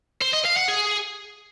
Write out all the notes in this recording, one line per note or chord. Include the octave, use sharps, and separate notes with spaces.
C5
D#5
F5
F#5
G#4